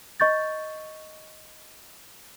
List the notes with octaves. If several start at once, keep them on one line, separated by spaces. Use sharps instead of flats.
D#5 C#6 G6 A6